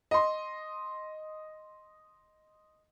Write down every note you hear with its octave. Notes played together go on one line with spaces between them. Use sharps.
D#5 C6